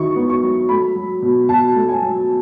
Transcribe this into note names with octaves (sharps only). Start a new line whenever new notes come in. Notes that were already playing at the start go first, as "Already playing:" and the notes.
Already playing: D#3 F#3 E4 C#6
B3
C#6
F#3
A3 B5
F#3
B2
B2 A5
A3
G#5
F#3